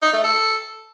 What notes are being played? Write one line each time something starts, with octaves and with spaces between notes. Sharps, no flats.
D#4
A3
A4